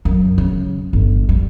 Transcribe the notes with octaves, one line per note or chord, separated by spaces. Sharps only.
F#2
C#3
G1
G3